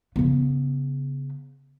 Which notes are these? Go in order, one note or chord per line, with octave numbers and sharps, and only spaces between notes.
C#3 B3